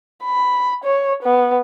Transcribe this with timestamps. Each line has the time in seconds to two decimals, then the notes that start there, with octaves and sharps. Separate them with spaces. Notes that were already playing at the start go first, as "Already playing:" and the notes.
0.24 B5
0.84 C#5
1.22 B3